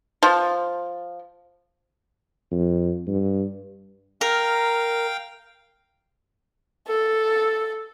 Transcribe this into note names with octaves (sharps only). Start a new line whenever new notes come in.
F3
F2
G2
A#4 F5 G5
A4